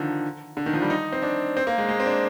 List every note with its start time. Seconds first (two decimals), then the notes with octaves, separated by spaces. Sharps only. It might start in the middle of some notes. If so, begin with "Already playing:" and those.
Already playing: D3 D#3 F3
0.57 D3
0.66 D#3
0.73 F3
0.82 G3
0.90 D#4
1.12 C4
1.23 D4
1.57 C4
1.67 A#3
1.78 G#3
1.88 G#3
2.00 C4
2.06 D4